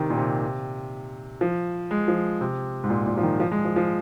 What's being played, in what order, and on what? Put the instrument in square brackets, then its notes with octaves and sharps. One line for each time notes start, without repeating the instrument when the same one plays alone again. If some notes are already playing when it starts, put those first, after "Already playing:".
Already playing: [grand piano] C3 D#3
A#2
C3
F3
G#3
F3
C3
G#2
A#2
A#2
F3
D#3
F3
G#3
F3
F3